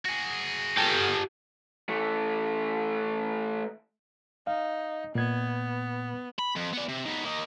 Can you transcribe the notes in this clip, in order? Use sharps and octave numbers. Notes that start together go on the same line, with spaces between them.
F#4 G#4
G4 A4
E3 A3
D#4 F5
A#2 B3 G#6
B5
F2
B3 D5
C3
D#3 B3
A#3 D#4